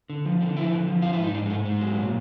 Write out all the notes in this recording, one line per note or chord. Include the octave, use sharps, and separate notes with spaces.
D3
F3
D3
F3 E4
D3
F3
F2 F4
E4
G#2
D#4
G#2 D4
G#3
G#2 A3
G#2 G#3
F#3
A#2